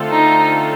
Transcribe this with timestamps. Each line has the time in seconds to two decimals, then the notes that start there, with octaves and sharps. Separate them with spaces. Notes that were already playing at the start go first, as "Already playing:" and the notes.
Already playing: D3 A3 C4 F4 A4
0.10 D#4